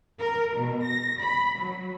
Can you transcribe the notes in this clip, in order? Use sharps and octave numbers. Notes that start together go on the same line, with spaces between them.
A#4
B2
A#6
B5
F#3